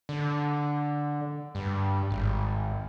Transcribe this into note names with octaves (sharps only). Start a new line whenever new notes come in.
D3
G2
G#1